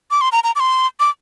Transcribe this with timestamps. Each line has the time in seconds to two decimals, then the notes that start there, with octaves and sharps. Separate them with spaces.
0.11 D6
0.21 C6
0.32 A#5
0.44 A#5
0.56 D6
0.60 C6
1.00 D6